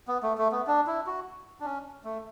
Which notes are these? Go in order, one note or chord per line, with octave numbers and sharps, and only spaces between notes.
B3
A3
A3
B3
D4
E4
F#4
D4
C#4
A3